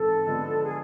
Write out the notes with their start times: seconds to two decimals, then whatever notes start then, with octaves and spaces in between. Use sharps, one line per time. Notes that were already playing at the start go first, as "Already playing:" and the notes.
Already playing: G#2 E3 C4 E4 A4
0.26 D3 F3 G#3 B3 D4
0.65 G#4